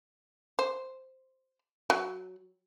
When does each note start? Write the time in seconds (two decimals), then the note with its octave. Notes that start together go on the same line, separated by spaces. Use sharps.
0.59 C5
1.90 F#3